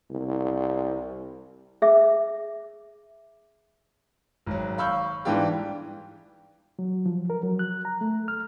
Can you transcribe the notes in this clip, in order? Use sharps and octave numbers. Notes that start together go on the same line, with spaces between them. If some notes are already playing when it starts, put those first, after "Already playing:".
C2
G#4 E5 D6
G#1 F#3
F5 B5 C#6 E6 G6
G#2 E3 G3 D4 F4 G4
F#3
F3
A#4
F#3
F#6
A#5
A3
F6